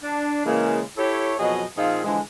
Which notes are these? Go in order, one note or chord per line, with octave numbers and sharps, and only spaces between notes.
D4
C#3 E3 G#3 A#3
E4 G4 A4 C#5
F2 B2 F#3 G#4 D#5
A#2 F3 C4 D#4 G#4 F5
D3 E3 F3 G#3